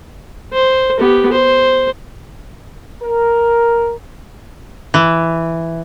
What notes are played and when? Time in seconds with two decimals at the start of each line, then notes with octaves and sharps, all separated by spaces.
0.53 C5
1.00 B3 G4
1.32 C5
3.01 A#4
4.94 E3